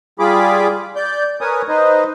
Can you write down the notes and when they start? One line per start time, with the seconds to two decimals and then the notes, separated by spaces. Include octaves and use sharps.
0.19 G3 F4 G#4 B5 D6
0.96 D5 G6
1.41 A#4 B4 C#5 G#5 D#6
1.68 D#4 B4 C5 D#5